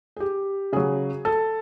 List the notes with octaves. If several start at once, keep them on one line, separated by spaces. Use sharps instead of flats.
G#4
G4
C#3 F#3 G#4
A4